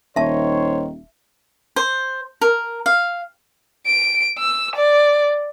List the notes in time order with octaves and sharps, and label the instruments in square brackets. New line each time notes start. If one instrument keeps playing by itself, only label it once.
[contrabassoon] D#1 [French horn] D#3 [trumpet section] C5 C#5 [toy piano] E5 A5
[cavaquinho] C5
A#4
F5
[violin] D7
E6
D5